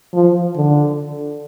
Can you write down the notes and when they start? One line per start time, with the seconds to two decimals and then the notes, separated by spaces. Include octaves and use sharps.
0.14 F3
0.56 D3